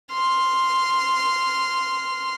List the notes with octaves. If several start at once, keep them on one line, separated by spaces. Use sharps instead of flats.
C6 F6